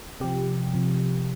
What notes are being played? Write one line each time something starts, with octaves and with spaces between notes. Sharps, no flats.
C3 F3 G4
C3 F3